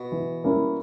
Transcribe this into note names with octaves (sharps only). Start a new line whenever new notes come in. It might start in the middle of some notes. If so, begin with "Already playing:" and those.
Already playing: B2
E3
G3 A#3 C#4 E4